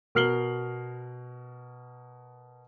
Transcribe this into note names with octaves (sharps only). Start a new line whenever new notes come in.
B2 A#4 F6 C7 F#7 G7